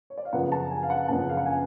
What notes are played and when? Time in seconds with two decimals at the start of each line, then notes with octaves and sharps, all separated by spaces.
0.10 C#5
0.18 D5
0.25 F5
0.33 F#1 F#2 C#3 F3 B3 F#5
0.52 A5
0.71 G#5
0.83 F5
0.90 F#5
1.08 F#1 F#2 C#3 F3 B3 A5
1.29 F5
1.37 F#5
1.46 G#5